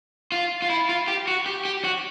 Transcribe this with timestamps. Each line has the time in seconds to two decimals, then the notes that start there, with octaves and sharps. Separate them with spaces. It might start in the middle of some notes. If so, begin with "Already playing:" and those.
0.32 F4
0.62 F4
0.70 E4
0.89 F4
1.08 G4
1.27 F#4
1.46 G4
1.65 G4
1.84 F#4